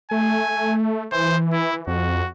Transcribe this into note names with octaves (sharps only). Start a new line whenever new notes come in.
A3 G#5
E3 C5
E4
F2 F#4